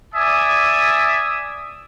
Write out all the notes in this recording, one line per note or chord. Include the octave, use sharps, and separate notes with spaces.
D5 E5 G#5 D#6